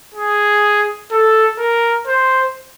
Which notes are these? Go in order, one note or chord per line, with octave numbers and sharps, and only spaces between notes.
G#4
A4
A#4
C5